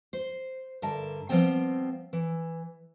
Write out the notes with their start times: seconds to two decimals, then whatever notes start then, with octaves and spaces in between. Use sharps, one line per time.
0.13 C5
0.82 G2 D3 A#4 E5 A5
1.29 F3 G3 B3 C4 G5
2.13 E3